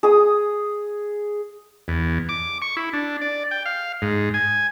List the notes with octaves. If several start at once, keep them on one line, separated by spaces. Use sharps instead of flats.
G#4 D#6
E2
D6
C#6
E4
D4
D5
G5
F5
G#2
G#5